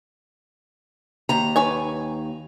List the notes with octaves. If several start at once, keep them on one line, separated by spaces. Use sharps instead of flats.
D#2 A#5
B4 C#5 G#5